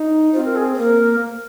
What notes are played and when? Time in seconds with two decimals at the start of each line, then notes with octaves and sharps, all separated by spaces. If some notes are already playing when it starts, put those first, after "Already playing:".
Already playing: D#4
0.34 C4 F4
0.45 A#4
0.56 G#4
0.77 A#3 A#4